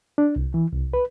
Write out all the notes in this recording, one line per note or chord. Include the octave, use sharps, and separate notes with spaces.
D4
C2
E3
C2
B4